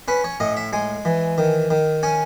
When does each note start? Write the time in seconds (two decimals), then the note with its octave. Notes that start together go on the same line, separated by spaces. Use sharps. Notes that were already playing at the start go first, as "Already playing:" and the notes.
0.08 C#4 B4
0.24 C#5
0.40 A2 D#5
0.57 E5
0.73 G#3 G#5
1.05 E3
1.38 D#3
1.71 D#3
2.03 C#4 G#5